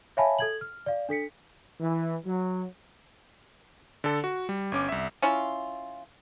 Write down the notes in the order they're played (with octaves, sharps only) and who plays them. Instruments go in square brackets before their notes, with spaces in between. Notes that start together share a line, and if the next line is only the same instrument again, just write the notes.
[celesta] C#5 E5 F5 G#5 A5 B5
A4 G#6 F#7
F6
D5 F5
D4 A4 B6 C#7
[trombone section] E3
F#3
[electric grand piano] D3 A4
F#4
G3
G1 C#4 D6
C2 E5
[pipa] C#4 E4 F4